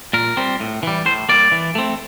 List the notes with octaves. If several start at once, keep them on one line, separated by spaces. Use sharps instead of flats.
A#2 A#4
G3 C4
A2
E3 G3
A2 C5
G3 A#3 D5
E3
A3 C4